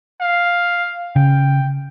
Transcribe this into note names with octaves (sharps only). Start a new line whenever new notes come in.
F5
C#3 G5